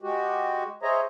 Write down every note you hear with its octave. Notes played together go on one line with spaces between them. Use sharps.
G#3 F#4 G4
G#4 C5 C#5 D#5 E5 A#5